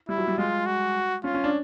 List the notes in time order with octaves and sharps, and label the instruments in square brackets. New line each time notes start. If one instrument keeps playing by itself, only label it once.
[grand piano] G3 [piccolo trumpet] E4
[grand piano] F#3
G3
[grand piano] G#3 [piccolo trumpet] F4
[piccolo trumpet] F#4
[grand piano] C#4 [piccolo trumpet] F4
[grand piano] C#4
D4